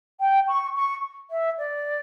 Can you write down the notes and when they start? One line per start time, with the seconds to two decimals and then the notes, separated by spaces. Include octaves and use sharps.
0.20 G5
0.48 C#6
0.75 C#6
1.30 E5
1.58 D5